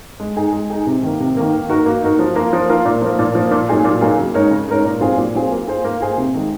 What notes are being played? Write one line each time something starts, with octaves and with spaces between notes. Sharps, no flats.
G#3
D#4 G#4
G#3
D#4 G#4
C3
D#3 A#3
C3
D#3 A#3
A#3
D#4 F#4 A#4
A#3
D#4 F#4 A#4
F3
A#3 F4 A#4
F3
A#3 F4 A#4
A#2
F3 A#3
A#2
F3 A#3
A#2
F#3 A#3 D#4 G#4
A#2
F#3 A#3 D#4 G#4
C#3
G#3 D#4 A#4 C#5
C#3
G#3 D#4 A#4 C#5
A#2
F#3 C4 F4 G#4
A#2
F#3 C4 F4 G#4
A#3
F4 G#4 C5
A#3
F4 G#4 C5
C3
D#3 G#3